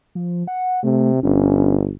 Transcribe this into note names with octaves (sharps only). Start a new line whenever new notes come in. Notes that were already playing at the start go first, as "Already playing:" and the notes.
F3
F#5
C3 A3
G1 C#4